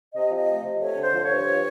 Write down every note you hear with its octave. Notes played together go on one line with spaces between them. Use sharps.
C3 D#5
F3
D#5
A3
C3
A3 C#5
D3
C5
F3
C#5
G2